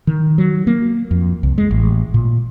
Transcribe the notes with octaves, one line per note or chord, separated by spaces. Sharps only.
D#3
F#3
A#3
F2
C2
G#3
A1
A#2